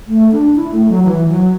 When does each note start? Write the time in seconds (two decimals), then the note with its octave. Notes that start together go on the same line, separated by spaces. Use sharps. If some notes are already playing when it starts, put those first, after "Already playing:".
0.07 A3
0.32 D4
0.55 E4
0.72 A3
0.88 F#3
1.04 E3
1.28 F#3